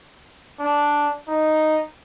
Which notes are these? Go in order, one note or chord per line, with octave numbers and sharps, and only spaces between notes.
D4
D#4